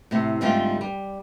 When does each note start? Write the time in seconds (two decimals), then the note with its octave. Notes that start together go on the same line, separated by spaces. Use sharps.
0.11 A2 C3
0.41 G#2 D3 G3 A3 C4 F4
0.81 G3